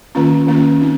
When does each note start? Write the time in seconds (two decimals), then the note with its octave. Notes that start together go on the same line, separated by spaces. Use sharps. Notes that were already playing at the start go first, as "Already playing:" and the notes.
0.15 D#3 A#3 C#4 F4
0.47 D#3 A#3 C#4 F4
0.81 C4 D#4